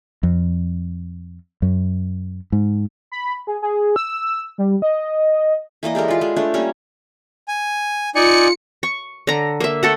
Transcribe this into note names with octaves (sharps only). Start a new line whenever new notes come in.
F2
F#2
G#2
B5
G#4
G#4
E6
G3
D#5
E3 A#3 D5 D#5
G#3 G4 A4 A#4
F4 B4
G#3
A3 D4 C#5
G3 A#3 C#4 C#5
G#5
D#4 F4 D5 G#5 C#7
C#6
D3 A#5
A#3 E5
A3 A4 F#5